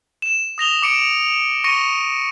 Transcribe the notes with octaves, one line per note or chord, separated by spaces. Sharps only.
E7
D#6 A#6 F7 G7
D6 C#7 D7 E7
C#6 A#6 C#7 D#7